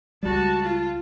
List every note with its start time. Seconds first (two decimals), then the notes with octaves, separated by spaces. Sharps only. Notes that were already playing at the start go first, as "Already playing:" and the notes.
0.23 C#2 G3 F#4 A5
0.63 F4